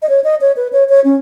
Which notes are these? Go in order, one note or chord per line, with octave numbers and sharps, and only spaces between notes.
D#5
C#5
D#5
C#5
B4
C#5
C#5
C#4